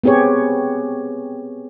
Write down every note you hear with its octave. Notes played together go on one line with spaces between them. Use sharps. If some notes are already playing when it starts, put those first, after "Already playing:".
B3 C4 G4 G#4 C#5